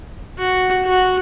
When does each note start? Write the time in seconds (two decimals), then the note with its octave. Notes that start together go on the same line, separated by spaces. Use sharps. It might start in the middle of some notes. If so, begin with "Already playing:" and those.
0.38 F#4
0.85 F#4